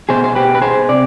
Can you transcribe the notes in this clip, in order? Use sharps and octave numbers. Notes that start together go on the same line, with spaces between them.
B2 G#4 C5
C5
G4 B4
B4
G#4 C5
C3 D5